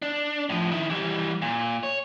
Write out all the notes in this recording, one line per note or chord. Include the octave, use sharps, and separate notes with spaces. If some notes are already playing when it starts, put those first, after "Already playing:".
D4
A2 F3
D#3 E4
E3 G3
A#2
C#5